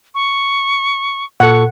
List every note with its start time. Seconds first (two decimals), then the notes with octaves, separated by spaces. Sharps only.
0.15 C#6
1.40 A#2 A4 F#5 C#6